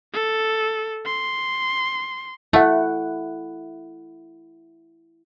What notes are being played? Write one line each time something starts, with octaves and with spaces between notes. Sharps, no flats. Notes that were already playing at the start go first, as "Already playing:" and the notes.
A4
C6
A3 E4 F#5